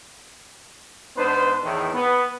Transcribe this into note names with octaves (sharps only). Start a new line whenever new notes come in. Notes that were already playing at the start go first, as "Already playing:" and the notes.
G#2 B3 D4 D#4 B4 C5
E2 A2 D#3
B3